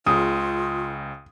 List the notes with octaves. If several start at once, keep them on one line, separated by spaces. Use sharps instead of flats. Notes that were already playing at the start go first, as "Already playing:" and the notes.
C#2 C#3 F4 D#6